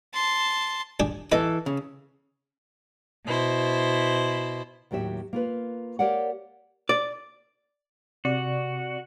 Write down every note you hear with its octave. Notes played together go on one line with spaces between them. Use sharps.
A5 C6
D4 G4 G#4
E3 A4 B4 D#5
C#3
B2 E4 C5
D#2 A2 F#3 G4 E5
A#3 F4 B4
G4 A#4 C#5 D5 F5 F#5
D5
C3 F#4 D5